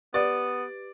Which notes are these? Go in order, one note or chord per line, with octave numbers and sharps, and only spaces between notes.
B3 G4 B4 D5